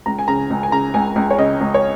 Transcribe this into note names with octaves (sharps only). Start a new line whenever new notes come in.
C#2 A#5
G#5
C#3 A#5
C#2
G#5
C#3 A#5
C#2 G#5
C#2
C#5
C#3 D#5
C#2
C#5